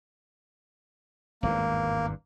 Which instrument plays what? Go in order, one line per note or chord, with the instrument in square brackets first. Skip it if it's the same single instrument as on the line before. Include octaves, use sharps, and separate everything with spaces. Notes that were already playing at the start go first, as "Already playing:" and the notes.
[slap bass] G#1 E2 G2 [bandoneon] A#3